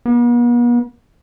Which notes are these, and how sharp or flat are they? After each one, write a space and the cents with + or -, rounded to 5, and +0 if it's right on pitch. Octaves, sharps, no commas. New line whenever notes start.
B3 -45